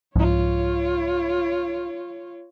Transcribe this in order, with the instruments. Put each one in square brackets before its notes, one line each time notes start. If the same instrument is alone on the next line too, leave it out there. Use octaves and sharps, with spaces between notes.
[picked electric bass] C2 G#2 F3 [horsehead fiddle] F4 C#5